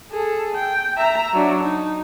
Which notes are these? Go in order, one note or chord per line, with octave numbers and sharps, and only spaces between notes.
G#4 A4
G5
E5 A#5
F#3 D4
D#4